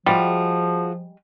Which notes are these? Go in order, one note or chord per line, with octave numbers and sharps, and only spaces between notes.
F3 G3 G#3 F4 F#4 G#4